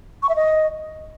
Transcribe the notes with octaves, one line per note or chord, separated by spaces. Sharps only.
C#6
E5
D#5